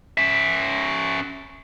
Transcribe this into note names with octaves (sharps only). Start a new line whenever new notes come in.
C#4 E5